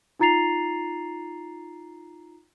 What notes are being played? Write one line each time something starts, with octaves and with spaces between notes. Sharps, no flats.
D#4 F4 A#5 A6 C7 F7